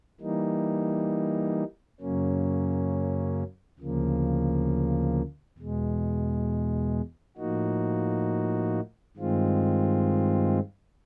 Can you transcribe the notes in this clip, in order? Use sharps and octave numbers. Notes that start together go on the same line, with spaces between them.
E3 G3 A#3 D#4
F#2 C#3 F#3 A#3 C#4
D2 C#3 F3 A#3
E2 B2 G#3
A2 F3 A#3 D#4 F#4
G2 D#3 G#3 C4 F4